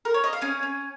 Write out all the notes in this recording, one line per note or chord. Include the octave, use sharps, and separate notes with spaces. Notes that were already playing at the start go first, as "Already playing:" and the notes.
A#4
C#5
D#5
F5
C#4 G#5
C#4